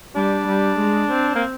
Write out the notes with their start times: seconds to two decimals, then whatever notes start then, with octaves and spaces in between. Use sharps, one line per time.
0.15 G3 D4
0.47 G3
0.78 G#3
1.12 C4
1.35 A#3